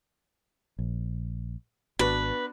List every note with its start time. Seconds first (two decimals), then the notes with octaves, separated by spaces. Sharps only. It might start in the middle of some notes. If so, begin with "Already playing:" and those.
0.79 A#1
1.99 G#1 B3 D4 F#4 B4